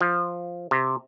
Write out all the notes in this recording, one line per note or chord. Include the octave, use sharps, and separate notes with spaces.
F3
C3